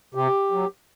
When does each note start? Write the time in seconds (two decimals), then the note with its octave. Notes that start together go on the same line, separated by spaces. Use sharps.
0.14 C3 G4
0.52 F#3